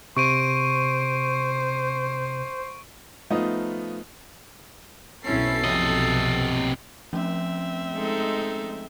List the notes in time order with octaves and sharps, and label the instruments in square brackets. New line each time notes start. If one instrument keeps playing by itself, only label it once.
[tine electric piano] C3 [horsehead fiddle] C5 [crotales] C#6 D7 D#7
[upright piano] F3 A3 B3 D#4 F4
[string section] B1 C7 [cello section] C4 C#4 E4 [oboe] A4
[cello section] F2 [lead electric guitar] C3 D#5
[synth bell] F3 A3 C#4 [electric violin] C4 E5
[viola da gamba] G#3 D#4 A4